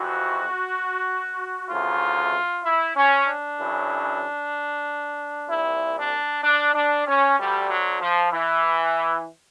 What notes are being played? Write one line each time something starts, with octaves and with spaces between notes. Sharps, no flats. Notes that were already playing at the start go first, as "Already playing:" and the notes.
Already playing: F2 C3 E3 F#4
D2 C#3 E3 F4
E4
C#4
D4
F#2 C#3 E3
C2 A#2 E4
D4
D4
D4
C#4
D2 D3 G3
F#3
F3
E3